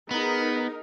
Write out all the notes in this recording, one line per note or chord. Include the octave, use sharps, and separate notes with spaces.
B3 D#4 G#4 A#4